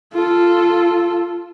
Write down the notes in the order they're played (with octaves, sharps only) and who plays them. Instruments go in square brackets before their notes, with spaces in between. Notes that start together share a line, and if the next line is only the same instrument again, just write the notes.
[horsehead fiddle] F4 A4